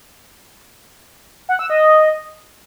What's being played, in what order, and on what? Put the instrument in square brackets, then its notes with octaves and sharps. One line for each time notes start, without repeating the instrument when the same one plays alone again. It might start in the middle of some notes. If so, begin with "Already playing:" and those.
[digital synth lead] F#5
E6
D#5